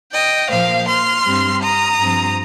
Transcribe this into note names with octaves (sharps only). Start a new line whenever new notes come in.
D#5 G5
A#2 F3 A#3 C5 F5
C6 F6
G2 G3 C4
A#5 D#6
G2 F3 C4